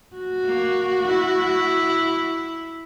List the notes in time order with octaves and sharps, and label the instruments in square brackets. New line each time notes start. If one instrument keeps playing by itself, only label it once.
[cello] F#4
[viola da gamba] A#3
E4